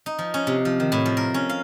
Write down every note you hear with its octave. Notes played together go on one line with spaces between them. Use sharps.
D#4
F3
C#4
C3
F3
D#3
A2
F3
A#4
C#4
F5